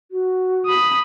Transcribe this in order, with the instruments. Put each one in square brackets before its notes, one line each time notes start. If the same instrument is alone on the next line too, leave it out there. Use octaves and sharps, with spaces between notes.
[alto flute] F#4
[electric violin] B5 D#6